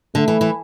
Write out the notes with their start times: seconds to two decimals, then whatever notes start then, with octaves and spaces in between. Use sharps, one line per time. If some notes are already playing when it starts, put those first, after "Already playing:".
0.15 D3 A3
0.28 E3
0.41 E3